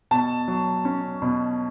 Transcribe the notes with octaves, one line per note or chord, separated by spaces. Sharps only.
B2 A5
F#3
C#4
B2